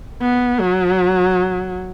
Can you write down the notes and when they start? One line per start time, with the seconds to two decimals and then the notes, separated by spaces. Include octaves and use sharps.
0.22 B3
0.60 F#3